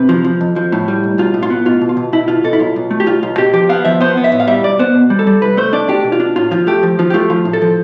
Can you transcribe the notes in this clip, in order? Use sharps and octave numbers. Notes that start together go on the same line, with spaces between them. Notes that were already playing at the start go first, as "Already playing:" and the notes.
Already playing: C3 B4
F3
F3
F2
F3
A2
G3
B1
B1 F4
A2
F4
B3
B2 F4
B2
F4
B2
B2 E4
B2 F4
B2 A4
E4
B1 F4
B1
A3
G4
B1 F4
B1 F4
B2 G4
F3 G4
B3 F5
F3 E5
B3 C5
B3
E5
A2
F5
G3 E5
B1 D5
B3 C5
B2
G3
A4
G3
C2 B4
A3 C5
D4 D5
D4 G4
B2
F4
D4
A2 F4
F3 F4
A3 G4
F3
F3 F4
G4
A3 F4
F3 F4
A2
A4
F3